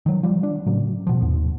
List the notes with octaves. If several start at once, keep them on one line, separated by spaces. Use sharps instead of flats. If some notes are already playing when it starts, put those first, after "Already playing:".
D#3 F#3
F3 G3
D4
A2 C#3 F#3
B2 F3
D#2 G#2